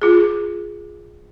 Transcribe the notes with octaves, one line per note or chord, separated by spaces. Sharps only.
F4 G#4